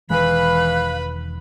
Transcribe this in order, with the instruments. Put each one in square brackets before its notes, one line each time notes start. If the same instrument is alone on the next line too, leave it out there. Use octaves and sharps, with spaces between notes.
[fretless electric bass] E1 D#3 G#3 [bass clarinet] E3 [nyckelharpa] B4 B5 [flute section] F5 F#6